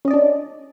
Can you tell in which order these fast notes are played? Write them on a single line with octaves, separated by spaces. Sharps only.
C#4 D#5 D5 D4